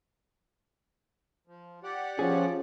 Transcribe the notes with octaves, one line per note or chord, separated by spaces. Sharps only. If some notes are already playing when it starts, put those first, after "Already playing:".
F3
G4 D5 F#5
F3 C#4 G#4